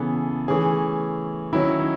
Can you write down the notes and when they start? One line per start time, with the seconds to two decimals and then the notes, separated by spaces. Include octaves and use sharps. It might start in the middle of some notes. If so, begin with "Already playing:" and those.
Already playing: C#3 E3 B3 G#4 A4
0.48 E3 A3 C#4 G#4
1.53 D#3 F#3 C#4 E4
1.79 D#4